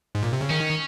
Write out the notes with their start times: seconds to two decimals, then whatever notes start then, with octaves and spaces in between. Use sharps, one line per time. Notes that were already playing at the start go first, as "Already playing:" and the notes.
0.15 G#2
0.23 A#2
0.33 C3
0.41 C#3
0.50 D#3 C#4